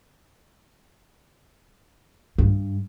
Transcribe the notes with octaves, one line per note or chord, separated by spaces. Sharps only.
G2